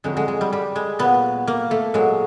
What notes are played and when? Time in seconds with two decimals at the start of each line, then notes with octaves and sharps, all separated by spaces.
0.04 F2 D3 F#3 G#3
0.17 G#3
0.28 G#3
0.41 G3
0.53 G3
0.76 G#3
0.99 A#2 F#3 B3
1.48 A#3
1.71 A3
1.94 A#2 F#3 G#3